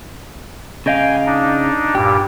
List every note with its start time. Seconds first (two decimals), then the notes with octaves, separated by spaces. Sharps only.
0.86 C#3 D#5 F5 G5 G#5
1.26 D4 D#4
1.95 G2 A#2 G4